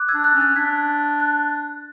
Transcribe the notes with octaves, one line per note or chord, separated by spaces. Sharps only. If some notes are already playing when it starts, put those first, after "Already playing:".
Already playing: D6 F#6
E6 G#6
D4
F#6 A6
C#4
F#6 A6
D4 G#6 B6
F#6 A6